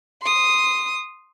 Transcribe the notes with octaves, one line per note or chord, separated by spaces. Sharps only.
C6 D#6